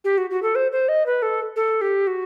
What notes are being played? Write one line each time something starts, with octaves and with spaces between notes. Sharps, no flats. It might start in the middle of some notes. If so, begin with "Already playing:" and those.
G4
F#4
F#4
A4
C5
C5
D#5
B4
A4
A4
G4
F#4